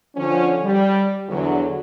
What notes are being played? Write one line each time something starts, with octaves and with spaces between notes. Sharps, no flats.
D3 F3 C#4
G3
E2 D3 F#3